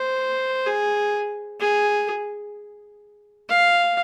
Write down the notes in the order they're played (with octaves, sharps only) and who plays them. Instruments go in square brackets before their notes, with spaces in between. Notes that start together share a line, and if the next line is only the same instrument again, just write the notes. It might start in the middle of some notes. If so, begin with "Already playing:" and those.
Already playing: [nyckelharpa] C5
G#4
G#4
F5